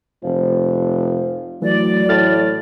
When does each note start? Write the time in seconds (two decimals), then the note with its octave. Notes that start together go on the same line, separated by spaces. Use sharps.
0.23 F1 F3
1.62 E3 F#3 A3 D5
2.09 A2 F6 A6